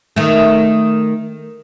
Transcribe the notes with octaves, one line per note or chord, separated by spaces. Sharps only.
D#3 A3